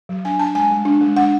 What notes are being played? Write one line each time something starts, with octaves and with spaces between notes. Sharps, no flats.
F#3
D4 G#5
D4 A5
G#3 G#5
G#3
D4
G#3
D4 F#5